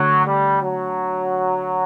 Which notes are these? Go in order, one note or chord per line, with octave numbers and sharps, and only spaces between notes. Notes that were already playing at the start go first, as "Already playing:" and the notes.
Already playing: D3 F#3 A3
G3
F#3